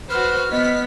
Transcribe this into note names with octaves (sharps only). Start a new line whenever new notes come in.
F#4 B4 C5 F6
B3 D#5 B6